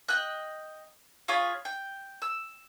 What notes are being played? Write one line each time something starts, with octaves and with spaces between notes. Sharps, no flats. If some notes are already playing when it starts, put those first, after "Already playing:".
D#5 G5 F#6
F4 G#4 C#5 B5
G5
E6